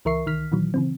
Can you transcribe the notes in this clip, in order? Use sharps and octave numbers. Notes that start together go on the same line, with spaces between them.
C#2 E3 A#4 E5 C#6 C7
C2 D#3 F6 B6
A#2 D#3 E3 F#3
C#3 E3 C4